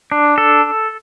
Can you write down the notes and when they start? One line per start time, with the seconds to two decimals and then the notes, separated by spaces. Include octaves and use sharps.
0.12 D4
0.38 A4